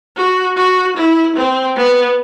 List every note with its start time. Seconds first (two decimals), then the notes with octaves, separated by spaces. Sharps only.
0.16 F#4
0.57 F#4
0.97 E4
1.36 C4
1.77 B3